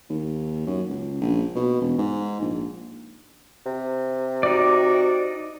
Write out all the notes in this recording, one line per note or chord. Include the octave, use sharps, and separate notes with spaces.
D#2
F#2
C#2
A#1
B2
E1
G#2
A#1
C3
D#4 F#4 D5